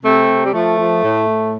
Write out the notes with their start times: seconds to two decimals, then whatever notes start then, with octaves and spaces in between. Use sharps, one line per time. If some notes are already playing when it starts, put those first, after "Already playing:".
0.03 C3 A3 C4
0.28 C3
0.44 G3
0.53 F3 A3
0.78 F3
1.03 A2
1.28 A2